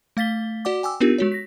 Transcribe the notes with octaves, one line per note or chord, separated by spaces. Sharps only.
A3 F5 A6 B6 G7
F#4 D5 F#5 D6
G5 G#5 D6 E6
B3 D4 D#4 F4 G4 A#4
G#3 F#4 C#5
A#6 B6